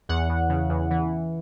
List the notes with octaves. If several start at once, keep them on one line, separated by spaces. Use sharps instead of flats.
E2 F#5
E2
C#3
E2
E3